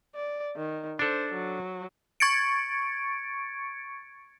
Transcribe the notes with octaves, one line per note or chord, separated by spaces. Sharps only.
D5
D#3
D4 A4 C5
F#3
C#6 G#6 A6 C#7 D7